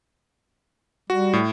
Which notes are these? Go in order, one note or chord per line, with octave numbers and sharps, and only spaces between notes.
G3 F#4
A2